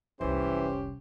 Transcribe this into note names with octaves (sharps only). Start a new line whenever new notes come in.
F1 C2 E3 C#4 G4 C5